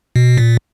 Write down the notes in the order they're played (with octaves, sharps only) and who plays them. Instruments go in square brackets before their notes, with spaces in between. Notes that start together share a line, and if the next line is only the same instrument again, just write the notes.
[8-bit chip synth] B2
A#2